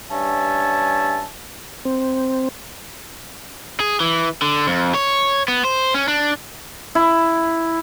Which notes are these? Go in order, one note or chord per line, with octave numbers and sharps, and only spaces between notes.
G2 C#4 E5 G#5 A5
C4
G#4
E3
D3
F2
C#5
B3
C5
C#4
D4
E4